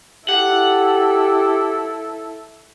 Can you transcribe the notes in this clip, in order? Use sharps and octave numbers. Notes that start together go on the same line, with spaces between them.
E4 G4 A4 F#5